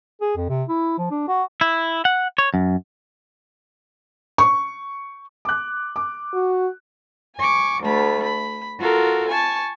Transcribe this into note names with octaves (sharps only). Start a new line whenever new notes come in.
G#4
F2
C3
E4
F3
D4
F#4
E4
F#5
C#5
F#2
C#6
D6 F#6
D6
F#4
G#5 C#6 D6
D2 A3 B5
B5
F4 F#4 A4 A#4
G#5 A5 C#6